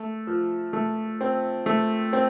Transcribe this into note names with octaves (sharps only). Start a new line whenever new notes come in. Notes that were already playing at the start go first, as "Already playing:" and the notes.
Already playing: A3
F3
A3
C4
A3
C4